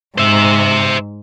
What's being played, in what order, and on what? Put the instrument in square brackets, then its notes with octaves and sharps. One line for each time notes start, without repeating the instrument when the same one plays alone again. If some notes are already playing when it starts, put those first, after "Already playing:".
[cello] G#2 [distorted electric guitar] C5 E5